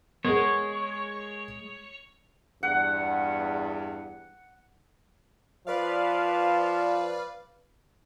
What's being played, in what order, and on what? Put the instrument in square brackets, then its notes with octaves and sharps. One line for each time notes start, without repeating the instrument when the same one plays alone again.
[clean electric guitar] G#3 [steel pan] B3 [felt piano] G#4 A#4 [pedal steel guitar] C#5
[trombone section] E2 G2 [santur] F#5
[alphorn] F3 [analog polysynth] B4 D5 F5